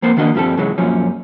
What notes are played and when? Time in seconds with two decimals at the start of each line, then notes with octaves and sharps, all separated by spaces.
0.02 F2 A#3 B3 C5
0.17 D#3 A#3 D4 F#4 D#5
0.35 G2 F3 G3 C4 A4
0.57 C#3 E3 F#3 G#3
0.78 F#2 A#2 F3 C#4